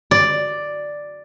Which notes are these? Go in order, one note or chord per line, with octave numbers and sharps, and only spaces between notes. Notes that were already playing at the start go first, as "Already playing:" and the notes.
D5